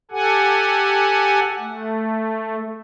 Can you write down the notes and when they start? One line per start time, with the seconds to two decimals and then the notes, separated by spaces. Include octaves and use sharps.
0.11 G4 A4 F#5 G#5
1.59 A3